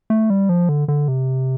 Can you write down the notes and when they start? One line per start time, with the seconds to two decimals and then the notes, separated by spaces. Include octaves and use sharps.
0.10 A3
0.30 G3
0.49 F3
0.69 D3
0.88 D3
1.08 C3